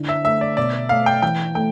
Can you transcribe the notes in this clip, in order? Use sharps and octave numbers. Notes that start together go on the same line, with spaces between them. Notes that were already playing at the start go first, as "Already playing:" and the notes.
Already playing: D3 E4
E5
A3 E5
D5
B2 D5
A3 F5
G5
E3 G5
A3 G5